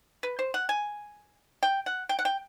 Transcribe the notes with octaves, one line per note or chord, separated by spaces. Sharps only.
B4
C5
F#5
G#5
G5
F#5
G5
F#5
G5